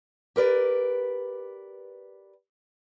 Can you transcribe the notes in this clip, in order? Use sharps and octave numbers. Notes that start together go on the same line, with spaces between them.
G4 A#4 B4 D5